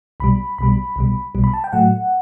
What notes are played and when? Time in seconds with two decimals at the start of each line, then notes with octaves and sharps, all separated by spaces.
0.20 C2 B2 G3 B5
0.58 C2 B2 G3 B5
0.96 C2 B2 G3
1.35 C2 B2 G3
1.44 B5
1.54 A5
1.64 G5
1.72 A2 F#3 A3 F#5